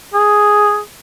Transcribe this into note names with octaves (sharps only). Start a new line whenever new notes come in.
G#4